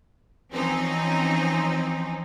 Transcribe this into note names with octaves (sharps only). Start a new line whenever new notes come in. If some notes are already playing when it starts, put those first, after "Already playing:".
E3 F3 C4 C#4 D#4